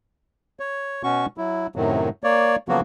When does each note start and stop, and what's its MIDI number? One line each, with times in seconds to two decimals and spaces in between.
0.60 1.02 73
1.03 1.26 47
1.03 1.26 61
1.03 1.26 66
1.03 1.26 85
1.38 1.67 54
1.38 1.67 64
1.76 2.09 42
1.76 2.09 45
1.76 2.09 48
1.76 2.09 51
1.76 2.09 54
2.24 2.56 58
2.24 2.56 73
2.24 2.56 74
2.69 2.81 49
2.69 2.81 53
2.69 2.81 54
2.69 2.81 58
2.69 2.81 59
2.69 2.81 66